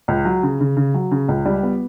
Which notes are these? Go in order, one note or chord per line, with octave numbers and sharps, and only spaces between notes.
C#2
F#3
C#3
C#3
C#3
F#3
C#3
C#2
G3
B3